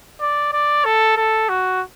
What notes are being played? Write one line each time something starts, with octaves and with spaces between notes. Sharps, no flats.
D5
D5
A4
A4
F#4